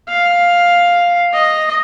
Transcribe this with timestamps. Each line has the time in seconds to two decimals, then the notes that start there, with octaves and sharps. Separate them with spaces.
0.08 F5
1.33 D#5